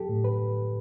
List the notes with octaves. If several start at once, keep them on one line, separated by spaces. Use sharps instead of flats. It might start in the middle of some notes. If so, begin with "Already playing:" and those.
Already playing: F#3 G4 A4
A2
B4